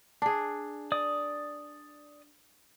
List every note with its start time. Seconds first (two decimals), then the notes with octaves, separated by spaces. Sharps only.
0.22 D4 G#4
0.92 D5 D#6